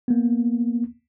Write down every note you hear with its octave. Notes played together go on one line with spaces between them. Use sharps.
A#3 B3